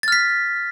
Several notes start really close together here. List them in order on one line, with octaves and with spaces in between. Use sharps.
A6 F6 B6